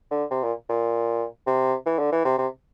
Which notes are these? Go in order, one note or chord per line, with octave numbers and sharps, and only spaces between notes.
D3
C3
A#2
A#2
C3
E3
D3
E3
C3
C3